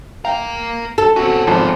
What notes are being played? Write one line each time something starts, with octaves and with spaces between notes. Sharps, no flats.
A#3 A#4 F5 G5
A4
C4 C#4 F#4
G#1 F3 G#4 D5 A5